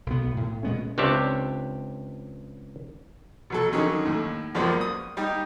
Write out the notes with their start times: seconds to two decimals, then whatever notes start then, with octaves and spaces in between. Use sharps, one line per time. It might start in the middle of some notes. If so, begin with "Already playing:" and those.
0.06 B1 B3
0.37 A2
0.63 A#2 G#3 B3 C#4
0.98 C#2 C4 D4 G4 C#5 E5
3.50 B2 F#3 A4
3.72 D3 D#3 F#3 C#4 D#4
4.05 D#2 A2
4.54 C#2 F#2 F3 A#3 B3 D5
4.81 D#6
5.17 G3 D#4 G4